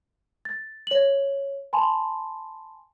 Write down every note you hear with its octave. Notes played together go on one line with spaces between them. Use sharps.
A6
C#5 F#7
G#5 A5 B5 C6